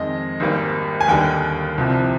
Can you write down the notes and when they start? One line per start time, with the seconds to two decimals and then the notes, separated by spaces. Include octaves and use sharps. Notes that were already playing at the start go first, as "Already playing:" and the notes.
Already playing: F2 D#3 G#3 D#5
0.40 G#1 G#2 G3 A#3
1.01 G#5
1.08 D#2 D3 G3 A#3 G5
1.78 C2 C3 F3